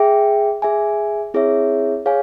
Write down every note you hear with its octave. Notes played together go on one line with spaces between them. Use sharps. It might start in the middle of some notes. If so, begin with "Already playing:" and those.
Already playing: G#4 E5 G5
G#4 E5 G#5
C4 E4 G#4 C#5 E5
G#4 C#5 F5 G#5